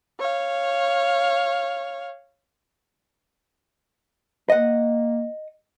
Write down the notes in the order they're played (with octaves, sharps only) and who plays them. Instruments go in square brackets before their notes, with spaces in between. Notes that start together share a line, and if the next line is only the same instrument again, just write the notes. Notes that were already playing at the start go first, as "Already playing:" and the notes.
[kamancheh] C#5 F5
[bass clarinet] A#3 [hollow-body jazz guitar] D#5 F#5